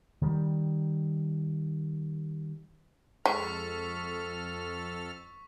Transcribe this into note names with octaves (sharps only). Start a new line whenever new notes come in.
D#3 G3
F2 G#3 A4 C#6 F6 B6